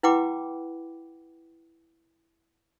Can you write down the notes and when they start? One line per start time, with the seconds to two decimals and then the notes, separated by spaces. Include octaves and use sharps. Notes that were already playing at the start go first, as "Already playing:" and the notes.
0.03 E4 B4 F#5 G5 B5 D6